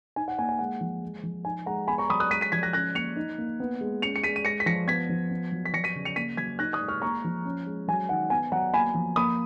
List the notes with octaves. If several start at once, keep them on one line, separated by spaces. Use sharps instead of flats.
D#4 G#5
F#5
A#3 G#5
G#5
G#3 F#5
F3
G#3
F3
D#4 G#5
G#3 F#5 A#5
B3 G#5 B5
A#5 C#6
F#3 B5 D#6
D#6 F#6
G#3 B6 D#7
B6 D#7
F3 G#6 B6
F#6 A#6
C#4 F#6 A#6
A#3 C#7 F7
D#4
A#3
B3
G#3
C#4 C#7 F7
C#7
G#3 B6 D#7
D#7
G#3 A#6 C#7
B6
F3 A#6 C#7
B3 G#6 B6
F3
B3
F#3
B6
F3 A#6 C#7
B6 D#7
C#3
C#7 F7
A#3 B6 D#7
F#3 G#6 B6
D#4 F#6 A#6
D#6 F#6
G#3
C#6 F6
A#3 A#5 C#6
F3
C#4
G#3
F#3 G#5
D#3 F#5
B3 G#5
F#3 F#5 A#5
A#3 G#5 B5
F3
A#3 B5 D#6